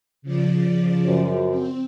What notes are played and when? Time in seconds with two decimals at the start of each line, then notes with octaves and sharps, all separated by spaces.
0.22 C#3 F3 D5
1.04 F#2 C5
1.49 C4